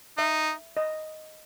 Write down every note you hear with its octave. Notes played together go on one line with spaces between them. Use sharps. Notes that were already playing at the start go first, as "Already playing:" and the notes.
D#4 E5
D#5